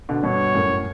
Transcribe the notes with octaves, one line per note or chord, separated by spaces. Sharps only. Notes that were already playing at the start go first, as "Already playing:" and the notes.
B2 D3
G2 B2 C#5
F#2 A2